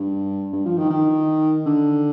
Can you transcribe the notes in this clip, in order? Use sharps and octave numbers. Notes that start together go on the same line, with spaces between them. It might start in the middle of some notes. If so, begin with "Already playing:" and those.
Already playing: G2
G2
F3
D#3
D#3
D3